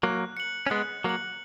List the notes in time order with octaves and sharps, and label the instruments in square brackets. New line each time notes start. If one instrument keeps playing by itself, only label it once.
[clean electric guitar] F#3 A#3 [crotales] F#6
[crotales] C#7 F#7
[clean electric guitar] C#4
[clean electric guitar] G#3 B3 [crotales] F#6
[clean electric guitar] F#3 A#3 [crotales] C#7 F#7